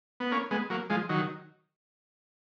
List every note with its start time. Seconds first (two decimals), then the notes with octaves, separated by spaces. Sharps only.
0.20 B3
0.31 A#3 C#4
0.51 G#3 B3
0.70 F#3 A#3
0.90 F3 G#3
1.09 D#3 F#3